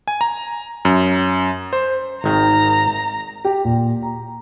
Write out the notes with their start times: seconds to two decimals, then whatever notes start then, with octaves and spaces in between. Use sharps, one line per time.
0.08 G#5
0.21 A#5
0.85 F#2
1.73 C5
2.24 G#1 D#3 A#5
3.45 G4
3.64 A#2
4.02 A#5